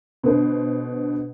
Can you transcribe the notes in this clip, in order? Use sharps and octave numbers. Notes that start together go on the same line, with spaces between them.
B2 D3 B4 C5